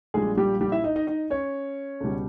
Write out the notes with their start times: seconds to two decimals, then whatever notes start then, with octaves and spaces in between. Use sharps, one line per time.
0.14 A#1 A#2 G3 G#3 G#4
0.37 G3 G4
0.61 G3 G4
0.72 E4 E5
0.84 D#4 D#5
0.96 D#4 D#5
1.07 D#4 D#5
1.30 C#4 C#5
2.00 C#2 B2 G3